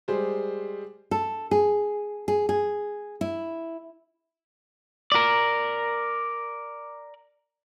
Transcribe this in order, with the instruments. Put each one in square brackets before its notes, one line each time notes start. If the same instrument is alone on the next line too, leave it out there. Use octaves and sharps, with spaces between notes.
[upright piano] G3 G#3 G#4 C5
[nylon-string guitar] A4
G#4
G#4
G#4
E4
[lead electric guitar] A#4 D5